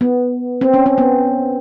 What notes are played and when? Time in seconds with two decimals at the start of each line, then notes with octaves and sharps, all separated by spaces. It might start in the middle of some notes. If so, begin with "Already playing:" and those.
0.01 B3
0.61 C4
0.74 C#4
0.86 C4
0.98 B3